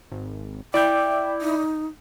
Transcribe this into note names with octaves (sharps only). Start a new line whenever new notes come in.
G#1
E4 D5 G5 D6 G6
D#4